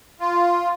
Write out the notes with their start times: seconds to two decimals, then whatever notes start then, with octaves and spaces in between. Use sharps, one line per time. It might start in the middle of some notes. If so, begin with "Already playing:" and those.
0.20 F4